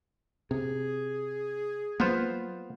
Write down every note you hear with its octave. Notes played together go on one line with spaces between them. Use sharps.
C3 G#4
F#3 A#3 B3 F4 C5